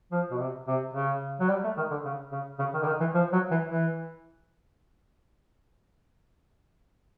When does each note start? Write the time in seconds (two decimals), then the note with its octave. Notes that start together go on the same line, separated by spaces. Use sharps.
0.12 F3
0.31 B2
0.39 C3
0.68 C3
0.94 C#3
1.40 F#3
1.49 G3
1.64 A3
1.77 D#3
1.91 D3
2.05 C#3
2.32 C#3
2.59 C#3
2.73 D#3
2.82 D3
2.87 D#3
3.00 E3
3.15 F3
3.33 F#3
3.51 E3
3.70 E3